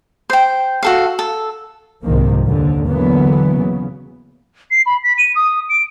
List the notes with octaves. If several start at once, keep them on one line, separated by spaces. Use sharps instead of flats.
C5 G5
F#4 A4 F5
A4
C2 G#2 C3 D#3 F3 A#3
D#2 G#2 D3
D3 E3 F#3 A#3 B3
C#3
C7
B5
B6
D#7
D#6
D7